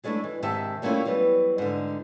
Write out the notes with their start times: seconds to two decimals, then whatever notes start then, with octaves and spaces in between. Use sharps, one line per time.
0.04 F#3 G#3 A3 C#4 D4 E4
0.24 E3
0.43 G#2 C3 D#3 G4 E5 A5
0.82 G3 A3 A#3 C#4 E4 F4
1.05 E3 F#3 G3 B3
1.58 G#2 D3